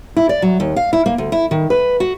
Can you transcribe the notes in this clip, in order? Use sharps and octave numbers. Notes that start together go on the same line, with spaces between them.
E4
D5
F#3
D#2
F5
E4
A#3
D2
E4
D#3
B4
F#4